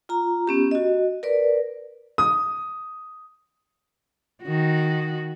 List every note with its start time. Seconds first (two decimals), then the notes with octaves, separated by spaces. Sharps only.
0.09 F4 A#5
0.47 B3 C#4 G4
0.71 F#4 D#5
1.23 A#4 B4 D5
2.18 D#6
4.42 D#3 F#4